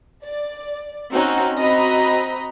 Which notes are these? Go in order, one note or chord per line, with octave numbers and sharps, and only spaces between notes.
D5
C4 C#4 D#4 F#4
C4 F#4 D#5 A#5 B5